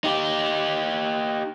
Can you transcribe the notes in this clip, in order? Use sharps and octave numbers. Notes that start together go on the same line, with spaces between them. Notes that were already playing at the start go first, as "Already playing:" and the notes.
D#4 G4